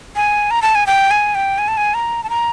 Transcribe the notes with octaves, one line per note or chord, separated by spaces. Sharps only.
G#5
A#5
A5
G#5
G5
G#5
G5
G#5
A5
G#5
A#5
A5
A#5